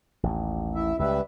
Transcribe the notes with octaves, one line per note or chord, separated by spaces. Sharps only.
A1 D#2
E4 E5
C#2 G3 B4 E5